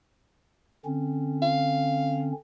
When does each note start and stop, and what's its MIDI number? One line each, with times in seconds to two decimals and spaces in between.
0.85 2.32 50
0.85 2.32 60
0.85 2.32 61
1.42 2.27 77